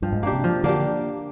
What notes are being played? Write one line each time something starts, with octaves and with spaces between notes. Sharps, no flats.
G2 F3
G#2
G2 A#3 D4 G4
C3
F3
D3 A#3 D4 G4